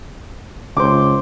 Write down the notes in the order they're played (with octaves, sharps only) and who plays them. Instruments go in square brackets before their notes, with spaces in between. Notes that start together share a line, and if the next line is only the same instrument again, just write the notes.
[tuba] C#2 [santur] C5 D6